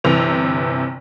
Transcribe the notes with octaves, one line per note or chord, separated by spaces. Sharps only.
G1 C3 E3 F7